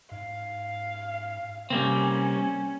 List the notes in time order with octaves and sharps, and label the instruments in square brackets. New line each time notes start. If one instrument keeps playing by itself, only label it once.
[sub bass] G#2 [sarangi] F5
[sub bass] C3 [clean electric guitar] G3 A#3 C4 [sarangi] C#4